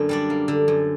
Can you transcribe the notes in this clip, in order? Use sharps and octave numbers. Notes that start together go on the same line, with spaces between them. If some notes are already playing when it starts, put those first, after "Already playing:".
Already playing: F#2 D3 A#3
G3 D4 D5
A#3
D3
F#2